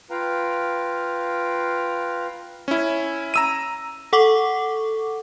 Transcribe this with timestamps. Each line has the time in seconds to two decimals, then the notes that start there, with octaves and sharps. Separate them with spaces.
0.11 F4 B4 F5 G5 A#5
2.68 C#4 E4
3.34 A#5 E6 D#7
4.13 A4 F#5 C#6 D6